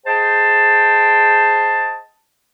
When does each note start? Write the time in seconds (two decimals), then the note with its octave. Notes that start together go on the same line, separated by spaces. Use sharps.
0.06 G#4 C5 D#5 G5 A5